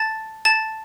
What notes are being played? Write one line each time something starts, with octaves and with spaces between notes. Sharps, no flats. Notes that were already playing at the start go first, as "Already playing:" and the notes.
Already playing: A5 A6
A5 A6